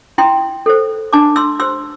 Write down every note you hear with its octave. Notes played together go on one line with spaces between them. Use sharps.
E4 G5 C6
A4 C5
D4 A5 D6
C6 E6
G4 C5 C6 E6